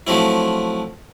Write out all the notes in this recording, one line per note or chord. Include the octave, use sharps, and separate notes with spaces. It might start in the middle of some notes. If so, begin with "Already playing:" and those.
F3 F#3 A3 C4 E4